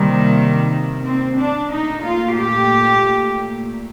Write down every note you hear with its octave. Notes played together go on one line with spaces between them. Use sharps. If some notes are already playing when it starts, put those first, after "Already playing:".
Already playing: C3 D#3 G3 A#3
C4
D4
A#2 A3 D#4
F4
G4